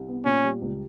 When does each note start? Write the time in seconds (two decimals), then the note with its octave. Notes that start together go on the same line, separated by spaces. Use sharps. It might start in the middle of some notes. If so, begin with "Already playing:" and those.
Already playing: C2
0.08 B3
0.25 A#2 C#4
0.44 G3
0.62 C#2